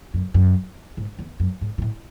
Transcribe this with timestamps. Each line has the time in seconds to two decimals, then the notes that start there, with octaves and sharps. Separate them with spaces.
0.14 F#2
0.34 F#2
0.97 G#2
1.19 E2
1.40 F#2
1.61 G#2
1.78 B2
1.82 A2